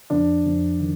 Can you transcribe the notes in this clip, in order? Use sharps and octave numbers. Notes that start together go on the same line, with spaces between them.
F2 D4
F2
D#3